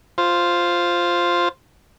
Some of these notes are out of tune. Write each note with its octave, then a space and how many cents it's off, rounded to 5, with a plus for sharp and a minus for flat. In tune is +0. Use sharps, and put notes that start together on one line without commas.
F4 +0 C5 +0